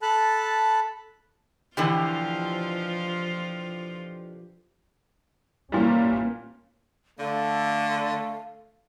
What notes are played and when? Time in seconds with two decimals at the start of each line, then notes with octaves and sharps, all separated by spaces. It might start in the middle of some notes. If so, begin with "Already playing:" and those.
0.02 A4 A5 B5 F#6
1.77 B2 D3 E3 F3 F4 G4
5.72 A#2 E3 G3 A#3 C#4
7.19 D3 A3 F5